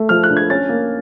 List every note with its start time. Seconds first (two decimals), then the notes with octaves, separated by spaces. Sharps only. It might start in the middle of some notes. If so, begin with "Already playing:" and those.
Already playing: A3
0.09 F3 F6
0.24 F#6
0.30 D4
0.37 G#6
0.50 C#4 A6
0.69 A#3